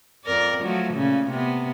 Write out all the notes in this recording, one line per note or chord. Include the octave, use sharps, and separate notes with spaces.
F2 A#4 D5
F3 F#3 A3
A#2 C#3
C3 B3